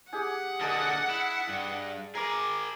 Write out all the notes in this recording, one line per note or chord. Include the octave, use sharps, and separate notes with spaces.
G4 G#4 F#5 G#5
D3 A#3 G#4 D#5 A5
E4
G2
G#4 A#4 A#5 B5 D6